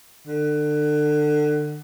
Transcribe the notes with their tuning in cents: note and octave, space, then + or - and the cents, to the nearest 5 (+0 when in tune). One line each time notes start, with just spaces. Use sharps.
D3 +30